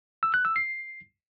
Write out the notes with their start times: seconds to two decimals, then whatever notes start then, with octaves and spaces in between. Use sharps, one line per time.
0.23 E6
0.34 F#6
0.45 E6
0.56 C7